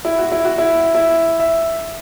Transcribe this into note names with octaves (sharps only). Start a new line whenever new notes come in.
E4
F#4
E4
F#4
E4
E4
E5